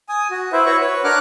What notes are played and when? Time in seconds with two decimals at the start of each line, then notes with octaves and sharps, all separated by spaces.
0.09 G#5 D#6
0.31 F#4
0.53 E4 B4 C5 E5
0.66 F#4 B4 C#5 E5 C#6
0.80 B4 C#5
1.04 D4 A#4 F#5 D6 F6 F#6